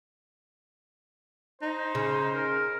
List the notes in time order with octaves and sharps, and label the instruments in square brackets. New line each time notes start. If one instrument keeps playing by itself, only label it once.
[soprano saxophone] D#4 [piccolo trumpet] C5
[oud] C#3
[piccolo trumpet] A#4